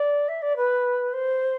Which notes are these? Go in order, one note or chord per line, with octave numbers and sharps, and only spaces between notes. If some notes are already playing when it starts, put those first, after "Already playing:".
Already playing: D5
E5
D5
B4
C5